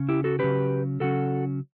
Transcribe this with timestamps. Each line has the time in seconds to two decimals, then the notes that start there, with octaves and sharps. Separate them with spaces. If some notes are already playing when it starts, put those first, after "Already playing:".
Already playing: C#3 C#4
0.09 E4 G4
0.24 F#4 A4
0.39 C#3 F#3 C#4 G4 B4
1.00 C#3 F#3 C#4 F#4 A4